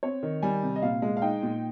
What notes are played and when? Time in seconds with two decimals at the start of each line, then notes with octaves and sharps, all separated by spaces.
0.03 C4 C#5
0.23 D#3
0.42 G3 G#5
0.63 C3
0.76 D#5
0.82 A#2 F5
1.02 G#3
1.17 F5
1.22 D#4 G5
1.43 A#2